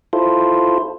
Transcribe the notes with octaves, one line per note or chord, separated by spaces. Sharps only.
E4 F4 A4 C5